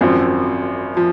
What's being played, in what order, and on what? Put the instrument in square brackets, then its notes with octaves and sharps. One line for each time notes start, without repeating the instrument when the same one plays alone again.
[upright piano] G#1 F#2 F3 C4
F3